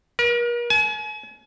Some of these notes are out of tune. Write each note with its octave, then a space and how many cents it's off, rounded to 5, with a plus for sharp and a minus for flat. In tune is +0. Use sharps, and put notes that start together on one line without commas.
A#4 +40
G#5 +40